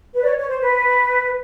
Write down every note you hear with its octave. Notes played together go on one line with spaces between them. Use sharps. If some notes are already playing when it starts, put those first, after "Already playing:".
B4
D5
C#5
C#5
C5
B4